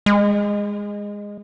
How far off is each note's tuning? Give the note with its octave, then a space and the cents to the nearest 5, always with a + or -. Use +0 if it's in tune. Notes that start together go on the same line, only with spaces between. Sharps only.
G#3 -15